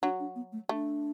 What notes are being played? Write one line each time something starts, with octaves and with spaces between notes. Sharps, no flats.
F#3 D4
D4
B3
A3
A3 D4